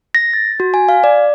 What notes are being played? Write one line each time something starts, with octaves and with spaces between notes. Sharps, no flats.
A#6
A6
F#4
G#5
F5
D5